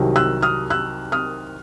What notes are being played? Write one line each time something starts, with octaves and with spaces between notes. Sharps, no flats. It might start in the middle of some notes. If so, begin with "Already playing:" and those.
Already playing: C2 C3 D#3 F#3
E6 F#6
D#6 F6
E6 F#6
D#6 F6